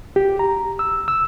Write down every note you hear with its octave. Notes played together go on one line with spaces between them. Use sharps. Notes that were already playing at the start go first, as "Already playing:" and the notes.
G4
A#5
E6
E6